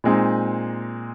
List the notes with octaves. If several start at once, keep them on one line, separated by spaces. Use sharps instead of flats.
A#2 G#3 C4 D#4